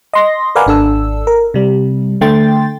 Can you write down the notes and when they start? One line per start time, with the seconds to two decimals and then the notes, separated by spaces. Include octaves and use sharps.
0.13 D#5 C6 A#6
0.55 A#4 B4 D5 F5 F#5 G#5
0.67 G#1 D4 A4 E6
1.27 A#4
1.54 C3 G3
2.21 D3 A3 G5 C6 A6